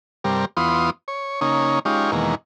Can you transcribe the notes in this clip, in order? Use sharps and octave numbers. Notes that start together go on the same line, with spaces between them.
G2 C3 G3 A#4
E2 B3 F4 C6 D#6
C#5
C#3 A#3 C#4 D#4
G#3 C#4 D#4 F4 G4
E2 B2 D#3 G#3 A#3